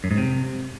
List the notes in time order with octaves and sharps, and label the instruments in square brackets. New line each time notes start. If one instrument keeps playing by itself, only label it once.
[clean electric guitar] F#2
G#2
C3